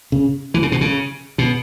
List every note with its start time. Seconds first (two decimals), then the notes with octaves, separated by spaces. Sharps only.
0.12 C#3
0.54 E3
0.63 C#3
0.72 B2
0.81 C#3
1.38 B2